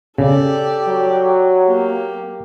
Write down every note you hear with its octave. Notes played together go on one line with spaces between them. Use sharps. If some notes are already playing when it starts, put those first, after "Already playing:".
C#3 G4 A4 D5
F#3
A#3 G4